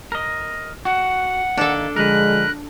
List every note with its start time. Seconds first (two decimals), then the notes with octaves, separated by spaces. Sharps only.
0.12 A#4 D#5
0.85 F#4 F#5
1.58 D#3 A#3 D4 A4
1.96 D3 F3 G#3 A#4 B4 F#6